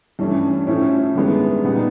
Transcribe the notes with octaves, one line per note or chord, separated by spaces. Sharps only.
G2 E3 A3 C#4
A2 F3 A3 C#4 E4
G2 D#3 G#3 B3 E4
A#2 G3 B3 D#4